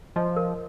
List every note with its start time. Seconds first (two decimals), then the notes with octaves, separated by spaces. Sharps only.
0.16 F3 D#5
0.36 A#4